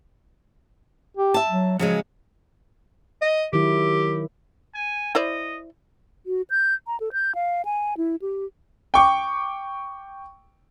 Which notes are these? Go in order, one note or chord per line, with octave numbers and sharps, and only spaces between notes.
G4
E5 A5
F#3
C#3 F3 F#3 G#3
D#5
D#3 F#3 E4 G4
G#5
E4 C5 D5 D#5
F#4
G6
A#5
A4
G6
F5
G#5
E4
G4
G5 C#6 D6